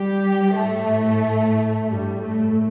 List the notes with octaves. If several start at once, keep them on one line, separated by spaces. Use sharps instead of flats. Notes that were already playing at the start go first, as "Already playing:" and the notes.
Already playing: G3 G4
A2 A3
G2 G3
A2 A3